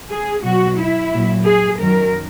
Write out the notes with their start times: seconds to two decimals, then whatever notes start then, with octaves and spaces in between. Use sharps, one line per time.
0.10 G#4
0.44 B2 F#3 F#4
0.78 E4
1.12 A#2 F#3
1.46 G#4
1.80 F#2 D#3 F#3 A#4